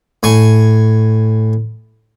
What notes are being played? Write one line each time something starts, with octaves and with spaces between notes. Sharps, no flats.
A2 G#5 C#6